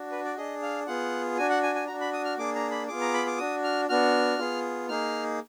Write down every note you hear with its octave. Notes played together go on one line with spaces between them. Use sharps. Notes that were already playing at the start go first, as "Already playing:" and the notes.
Already playing: D4 F#4
B4
D5
D4 G#4 D#5
F5
B3 F4 G#4 F#5
D4 F#4 G#5
F#5
G#5
G#5
D4 F#4 A#5
B5
D#6
F6
A#3 D4 G#4 D6
A#5
B5
B3 F4 G#4 D6
A#5
B5
D6
D4 F#4 D#6
F6
B3 D4 F#4 F6
B3 F4 G#4
A#3 D#4 G#4 F6